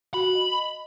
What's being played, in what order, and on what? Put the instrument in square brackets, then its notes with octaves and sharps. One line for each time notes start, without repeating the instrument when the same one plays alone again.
[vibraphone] F#4 [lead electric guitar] B5
[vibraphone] D#5